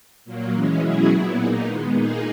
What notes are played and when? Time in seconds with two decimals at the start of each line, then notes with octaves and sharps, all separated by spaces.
0.25 A#2 F#3 A#3
0.53 E3 G#3 C#4
0.81 B2 F#3 C#4 E4 G#4
1.09 A#2 F#3 B3 E4
1.36 A#2 A#3 D#4 G#4
1.64 D#3 G#3 B3
1.93 A#2 A#3 D#4 G#4